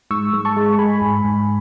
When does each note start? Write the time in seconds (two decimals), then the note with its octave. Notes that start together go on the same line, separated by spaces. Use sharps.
0.11 G#2 C#6 E6
0.33 G#2
0.45 A5 C#6
0.57 G#3
0.79 G#3 G#5 B5
1.02 G#2
1.24 G#2